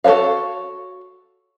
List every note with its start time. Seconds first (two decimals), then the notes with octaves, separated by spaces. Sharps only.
0.04 F#4 A4 B4 C#5 F5